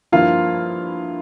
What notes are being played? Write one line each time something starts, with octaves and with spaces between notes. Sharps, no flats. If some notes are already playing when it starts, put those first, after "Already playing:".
G2 F3 A#3 E4 F4 F5